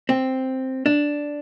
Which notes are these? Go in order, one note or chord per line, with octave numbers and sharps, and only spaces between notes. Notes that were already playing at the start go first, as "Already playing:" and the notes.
C4
D4